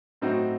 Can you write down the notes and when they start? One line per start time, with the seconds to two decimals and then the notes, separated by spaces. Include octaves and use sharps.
0.22 A2 F#3 C4 D#4 F#4